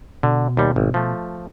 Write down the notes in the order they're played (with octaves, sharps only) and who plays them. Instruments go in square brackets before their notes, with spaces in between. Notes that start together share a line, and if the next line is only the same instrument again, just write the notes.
[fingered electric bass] B2 [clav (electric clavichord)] D3
[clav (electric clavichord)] D#2 G3
G#1
F3 A3